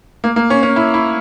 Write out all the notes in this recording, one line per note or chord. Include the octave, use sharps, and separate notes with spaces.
A#3
A#3
C#4
C#4
E4
E4